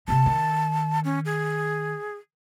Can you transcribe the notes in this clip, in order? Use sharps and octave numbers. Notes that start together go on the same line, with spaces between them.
C3 A#3 A5
D#3
C#4
G#4